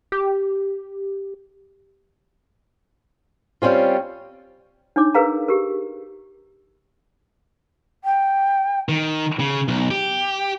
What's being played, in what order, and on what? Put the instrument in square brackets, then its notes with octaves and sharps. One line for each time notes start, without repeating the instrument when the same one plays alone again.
[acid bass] G4
[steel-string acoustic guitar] G3 C4 C#4 F4
[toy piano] D4 D#4 C#5 D6
G#4 A#4 B4 F5 A#5
G4 G#4 A#4
[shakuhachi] G5
[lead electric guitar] D#3
C#3
B1
G4